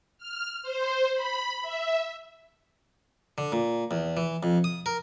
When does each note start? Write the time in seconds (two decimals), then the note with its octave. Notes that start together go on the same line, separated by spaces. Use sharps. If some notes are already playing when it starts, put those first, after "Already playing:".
0.18 F6
0.63 C5
1.14 B5
1.62 E5
3.38 D3
3.52 A#2
3.91 E2
4.17 E3
4.43 F2
4.64 D#6
4.86 A#4